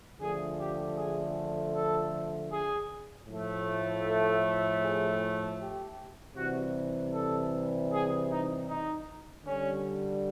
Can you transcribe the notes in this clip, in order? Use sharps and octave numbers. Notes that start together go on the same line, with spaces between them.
D3 F3 A3 G#4
G4
G#4
A4
G#4
A2 F3 A3
A4
G#4
G4
C3 E3 G3 F#4
A4
G#4
D#4
D#4
D3 G3 C#4